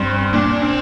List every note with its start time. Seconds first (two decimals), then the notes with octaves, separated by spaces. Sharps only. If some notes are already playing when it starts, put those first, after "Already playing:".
Already playing: G2 C4
0.33 A#2 D4
0.62 C4